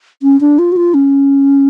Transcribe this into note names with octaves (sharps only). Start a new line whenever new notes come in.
C#4
D4
F4
F#4
F4
C#4